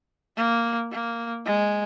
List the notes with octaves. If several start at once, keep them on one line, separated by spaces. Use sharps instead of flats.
A#3
A#3
G#3